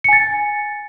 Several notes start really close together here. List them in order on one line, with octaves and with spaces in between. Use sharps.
C#7 G#5 A6